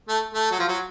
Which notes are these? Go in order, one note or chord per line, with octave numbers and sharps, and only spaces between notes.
A3
A3
F#3
F3
F#3